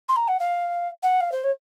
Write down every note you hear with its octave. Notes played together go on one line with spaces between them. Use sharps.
C6
A#5
F#5
F5
F#5
F5
C5
C#5